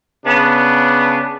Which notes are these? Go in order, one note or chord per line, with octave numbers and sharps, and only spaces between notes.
C#3 B3 D4